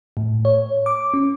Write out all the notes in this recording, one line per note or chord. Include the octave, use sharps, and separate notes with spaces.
A2
C#5
D6
C#4